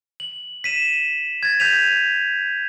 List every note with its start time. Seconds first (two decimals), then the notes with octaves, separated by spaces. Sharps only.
0.20 F#7
0.64 B6 D#7 E7
1.43 G#6 A6
1.60 G6 B6 D#7 F7